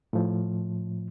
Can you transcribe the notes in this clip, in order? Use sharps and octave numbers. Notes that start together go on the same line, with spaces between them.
A2 F3